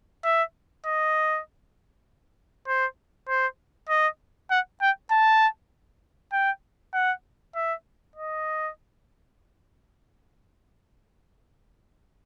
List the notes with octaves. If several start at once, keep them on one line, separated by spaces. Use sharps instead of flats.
E5
D#5
C5
C5
D#5
F#5
G5
A5
G5
F#5
E5
D#5